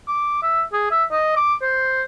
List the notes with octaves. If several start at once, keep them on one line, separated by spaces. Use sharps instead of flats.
D6
E5
G#4
E5
D#5
D6
C5